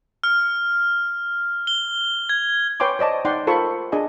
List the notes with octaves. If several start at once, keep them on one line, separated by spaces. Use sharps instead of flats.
F6
G7
G#6
B4 C#5 G5 G#5 C6 D6
C5 D5 D#5 A5
D#4 D5 F#5 G5 C6
F4 A4 A#4 C5 B5 C#6
D4 G#4 D#5 G#5